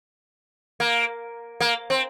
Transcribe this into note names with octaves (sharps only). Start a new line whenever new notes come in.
A#3
A#3
C4